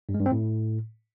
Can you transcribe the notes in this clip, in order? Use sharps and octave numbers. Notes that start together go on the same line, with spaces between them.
G2
G#3
G2
C4
A2